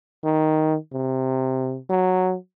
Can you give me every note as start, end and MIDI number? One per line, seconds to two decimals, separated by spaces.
0.24 0.76 51
0.93 1.77 48
1.89 2.35 54